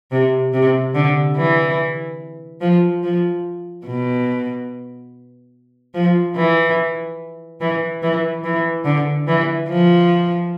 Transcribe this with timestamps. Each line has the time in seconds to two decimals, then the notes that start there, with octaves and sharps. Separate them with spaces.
0.12 C3
0.53 C3
0.95 D3
1.37 E3
2.61 F3
3.03 F3
3.87 B2
5.95 F3
6.36 E3
7.61 E3
8.02 E3
8.44 E3
8.85 D3
9.28 E3
9.69 F3